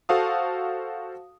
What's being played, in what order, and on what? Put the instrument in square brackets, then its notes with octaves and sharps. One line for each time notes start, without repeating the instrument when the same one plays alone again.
[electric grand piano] F#4 A4 C5 F5 A5 D#6